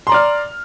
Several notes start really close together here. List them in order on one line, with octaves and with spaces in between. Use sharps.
C6 A#5 D5 F6